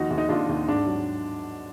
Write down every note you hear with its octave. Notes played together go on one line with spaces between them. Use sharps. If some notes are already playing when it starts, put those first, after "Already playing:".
Already playing: D#2 F3 D#4 F#4
D#2
D#4
D#2 D4 F4
D#2
G#2 D4
F#3